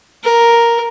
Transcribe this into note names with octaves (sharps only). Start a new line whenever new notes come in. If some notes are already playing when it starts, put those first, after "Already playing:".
A#4